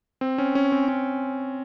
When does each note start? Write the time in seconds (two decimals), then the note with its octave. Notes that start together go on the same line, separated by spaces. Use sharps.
0.21 C4
0.38 C#4
0.55 C#4
0.72 C4
0.88 C#4